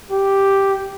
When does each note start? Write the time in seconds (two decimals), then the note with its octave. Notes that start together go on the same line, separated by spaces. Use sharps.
0.11 G4